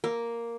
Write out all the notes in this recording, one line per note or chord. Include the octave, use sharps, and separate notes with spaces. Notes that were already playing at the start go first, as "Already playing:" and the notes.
A#3